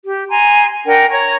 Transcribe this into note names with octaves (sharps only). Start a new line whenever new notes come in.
G4
G#5 A#5 C6
D4 A#4 F#5 G5
C#5 A#5 C#6 G#6